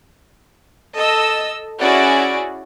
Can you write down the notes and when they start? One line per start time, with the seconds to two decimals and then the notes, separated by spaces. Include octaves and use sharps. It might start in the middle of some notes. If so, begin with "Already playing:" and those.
0.95 A4 D#5 E6
1.81 C#4 E4 F#4 G#4 D5 D7